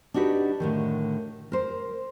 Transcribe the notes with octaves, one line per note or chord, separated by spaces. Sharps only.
D4 D#4 F#4 G4 B4
A2 D3 D#3
A#4 C5